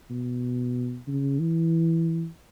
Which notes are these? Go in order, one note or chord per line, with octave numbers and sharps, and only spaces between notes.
B2
C#3
E3